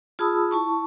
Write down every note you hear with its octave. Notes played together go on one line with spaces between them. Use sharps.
F4 G#4 A5 B5 D#6 E6
E4 A5 C#6